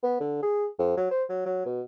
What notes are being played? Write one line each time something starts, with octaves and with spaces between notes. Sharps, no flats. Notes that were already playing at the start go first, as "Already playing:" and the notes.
B3
D3
G#4
F2
F#3
C5
F#3
F#3
B2